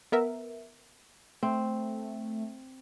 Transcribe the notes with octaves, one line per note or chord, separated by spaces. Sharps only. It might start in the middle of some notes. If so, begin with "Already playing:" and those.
B3 A#4 E5
A3 C4